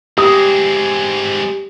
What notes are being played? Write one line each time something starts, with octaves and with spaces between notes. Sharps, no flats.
G#3 C4 G4 D#6